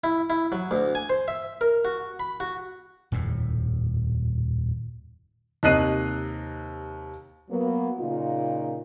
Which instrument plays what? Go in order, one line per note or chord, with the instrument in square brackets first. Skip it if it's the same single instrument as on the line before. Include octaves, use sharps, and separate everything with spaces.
[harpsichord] E4
E4
F#3
D2
G#5
C5
E5
A#4
F#4
B5
F#4
[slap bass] D#1 F2 A2
[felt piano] D#2 C3 D#5 F#6 C7 D#7
[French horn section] F#3 A#3 B3
A#2 C#3 D#4 F4